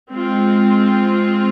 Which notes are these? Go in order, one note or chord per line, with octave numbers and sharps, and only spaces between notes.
G#3 C4 F4